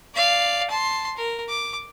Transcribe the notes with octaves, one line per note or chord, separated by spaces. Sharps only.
D5 F5
A5 C6
A#4
D6